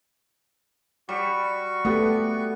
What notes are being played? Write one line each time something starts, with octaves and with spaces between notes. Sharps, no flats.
G3 F#4 C#6
A3 B3 G4